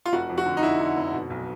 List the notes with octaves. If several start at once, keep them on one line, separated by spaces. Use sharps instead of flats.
F4
F1 F#4
F2
F#4
D3
D#4
D3 E4
D3
F1
B2
B1